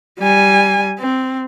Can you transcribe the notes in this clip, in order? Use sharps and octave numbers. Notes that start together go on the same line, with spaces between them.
G3 G#5
C4